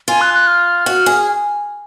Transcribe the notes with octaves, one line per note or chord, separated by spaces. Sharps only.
F4 G#5
F#6
F#6
F6
F#4
G#4